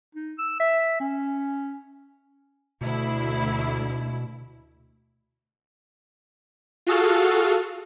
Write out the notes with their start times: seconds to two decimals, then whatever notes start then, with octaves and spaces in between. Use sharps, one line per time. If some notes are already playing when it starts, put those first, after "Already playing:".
0.15 D#4
0.39 E6
0.60 E5
1.00 C#4
2.81 D2 B2 E4
6.87 F4 F#4 G#4 A4 F5